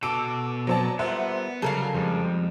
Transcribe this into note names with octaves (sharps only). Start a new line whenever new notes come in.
B2 F#4 A4 D6 E6 D7
F#3 C4 B4 C5 D5 A5
G3 B3 F4 A#4 C5 E5 F#5
C#3 F#3 G3 A4 A#4 F5
F2 F3 G3 G#3